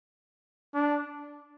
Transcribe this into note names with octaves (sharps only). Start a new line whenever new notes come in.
D4